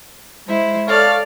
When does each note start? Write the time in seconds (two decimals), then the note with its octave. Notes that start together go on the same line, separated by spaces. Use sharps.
0.46 G#3 E4 C5
0.88 A4 C#5 D5 F5 F6